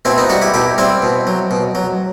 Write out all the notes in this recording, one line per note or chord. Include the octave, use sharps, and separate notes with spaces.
B2 C4 E4
B3 D#4
G3 D#4 F#4
E4 G4
B2 E4 G4
G3 C4 E4
B2
F#3
B2
F#3